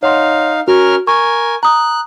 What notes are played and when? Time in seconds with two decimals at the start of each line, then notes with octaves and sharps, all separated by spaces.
0.03 D#4 C#5 F5 F#5 C6
0.68 C#4 F#4 A#4 F6
1.07 A#4 G#5 C#6
1.63 A#5 D#6 F#6